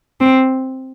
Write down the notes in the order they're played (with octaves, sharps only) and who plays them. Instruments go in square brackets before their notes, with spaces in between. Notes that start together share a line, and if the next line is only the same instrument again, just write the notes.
[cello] C4